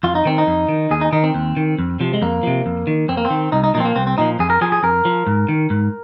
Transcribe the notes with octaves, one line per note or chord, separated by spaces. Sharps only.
F2 F4
D#4
D#3 C4
D#4
F2
D#3
D#2 G#4
D#4
D#3 D#4
C4
D#2
D#3
F2
C3 F3
G#3
F2 A#3
C3 F3
F2
D#3
F2 C4
A#3
C4
D#3
C2 D#4
D#4
A#2 F3 C4 D#4
A#3
C2 C4
C4
A#2 F3 D#4
F2 G#4
A#4
F3 G#4
G#4
F2 A#4
F3
G#2
D#3
G#2